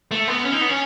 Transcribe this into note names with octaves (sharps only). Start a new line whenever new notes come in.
A3
B3
C#4
D#4
B3
C#4